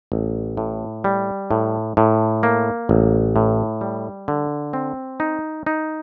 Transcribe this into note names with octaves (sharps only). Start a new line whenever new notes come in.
A1
A2
G3
A2
A2
A#3
A1
A2
G3
D3
C4
D#4
D#4